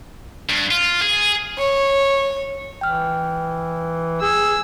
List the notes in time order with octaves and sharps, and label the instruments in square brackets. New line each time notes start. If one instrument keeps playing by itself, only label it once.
[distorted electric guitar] G2
F4
G#4
[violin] C#5
[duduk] E3 [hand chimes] G5 F6
[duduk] G#4 [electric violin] E6